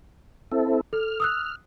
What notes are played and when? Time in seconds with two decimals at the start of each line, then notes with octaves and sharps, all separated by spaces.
0.52 C4 E4 A4
0.93 A4 F6
1.20 D#6 E6 F#6